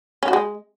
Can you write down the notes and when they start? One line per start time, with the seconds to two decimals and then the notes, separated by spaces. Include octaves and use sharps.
0.23 C#4
0.28 F#4
0.33 G#3